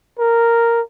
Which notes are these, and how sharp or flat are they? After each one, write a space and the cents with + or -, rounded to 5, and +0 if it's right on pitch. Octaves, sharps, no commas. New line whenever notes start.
A#4 -5